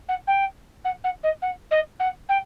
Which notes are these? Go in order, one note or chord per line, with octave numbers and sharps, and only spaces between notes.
F#5
G5
F#5
F#5
D#5
F#5
D#5
F#5
G5